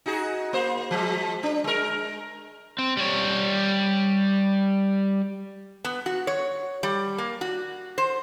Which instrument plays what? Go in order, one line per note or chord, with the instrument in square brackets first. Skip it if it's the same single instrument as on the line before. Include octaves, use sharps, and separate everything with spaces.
[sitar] D#4 F#4 G#4
A#3 C5
F3 G#3
D4
G#3 A#4
[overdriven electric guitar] C4
G3 C#5
[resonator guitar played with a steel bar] B3
F#4
C#5
G3
A#3
F#4
C5